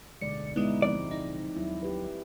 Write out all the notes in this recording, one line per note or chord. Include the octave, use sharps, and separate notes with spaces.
D1 B1 D3 G#3 D5 C#7
G#3 B3 D#4 E4 G#4
F3 C4 D5
D#4
D#2 F#3 E4
G4 B4